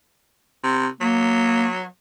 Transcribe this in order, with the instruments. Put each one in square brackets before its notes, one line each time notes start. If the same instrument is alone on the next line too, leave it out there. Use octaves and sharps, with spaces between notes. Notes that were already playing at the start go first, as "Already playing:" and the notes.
[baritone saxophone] C3
[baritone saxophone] F#3 [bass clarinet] A#3